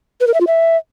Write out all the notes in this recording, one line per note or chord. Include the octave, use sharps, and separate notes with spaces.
B4
A#4
E5
F4
E5